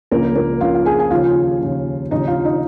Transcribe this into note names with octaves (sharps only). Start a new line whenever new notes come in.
C#2 C#3 F3 A#3 A#4
A#3 A#4
C#2 C#3 F3 F4 F5
F5
G#4 G#5
G#5
D#2 C#3 F3 F4 F5
D#2 C#3 F3
D#2 C#3 F3 D#4 D#5
F4 F5
D#4 D#5